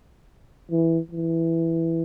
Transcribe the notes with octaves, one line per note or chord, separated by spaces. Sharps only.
E3
E3